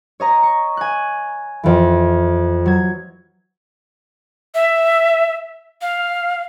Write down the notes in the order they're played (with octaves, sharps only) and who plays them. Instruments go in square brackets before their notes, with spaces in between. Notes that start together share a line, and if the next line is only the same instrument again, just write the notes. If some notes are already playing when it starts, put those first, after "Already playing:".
[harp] C#5 D#5 A#5
C#6
G#5 F#6
F2 E3
F#3 G#6
[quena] E5
F5